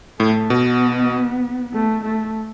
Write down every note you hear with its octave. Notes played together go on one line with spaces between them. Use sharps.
A2 A3
B2 B3
A3
A3